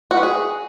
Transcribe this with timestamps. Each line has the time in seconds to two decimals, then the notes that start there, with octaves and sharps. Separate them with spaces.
0.11 F#4
0.17 B4
0.23 G#4